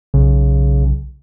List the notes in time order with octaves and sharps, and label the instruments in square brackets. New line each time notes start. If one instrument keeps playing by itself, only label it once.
[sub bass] B1 [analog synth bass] C#3